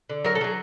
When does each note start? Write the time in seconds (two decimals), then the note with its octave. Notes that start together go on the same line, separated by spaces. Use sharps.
0.10 D3
0.24 F#3 A#4
0.35 A4
0.41 F#3 G#4